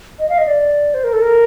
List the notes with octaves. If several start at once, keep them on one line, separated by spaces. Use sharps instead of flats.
D#5
F5
D#5
D5
C5
A#4
A4
A#4